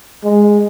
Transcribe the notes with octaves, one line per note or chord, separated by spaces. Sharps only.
G#3